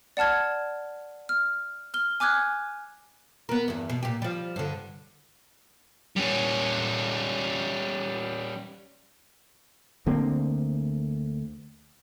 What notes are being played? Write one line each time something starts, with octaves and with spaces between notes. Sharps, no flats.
D5 F#5 A5 F6 G#6
F6
F6 G7
G#5 D6 F6 F#6 G#6
B3 A#4
E2 G2
B2
A#2 G4
F3 G3
G2 D3
G3 C#4
D2 D3 A#3 C4